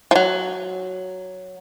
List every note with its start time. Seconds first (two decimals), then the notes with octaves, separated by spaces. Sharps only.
0.11 F3 F#3